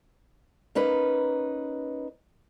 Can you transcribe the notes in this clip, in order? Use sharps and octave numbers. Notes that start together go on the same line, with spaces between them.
A#3 C#4 D#4 B4